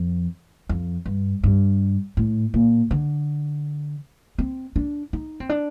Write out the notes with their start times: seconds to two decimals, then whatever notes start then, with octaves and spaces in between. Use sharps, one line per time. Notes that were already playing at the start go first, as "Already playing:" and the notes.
Already playing: F2
0.69 F2
1.06 G2
1.44 G2
2.17 A2
2.54 A#2
2.91 D3
4.38 C4
4.76 D4
5.13 D#4
5.40 C4
5.49 D4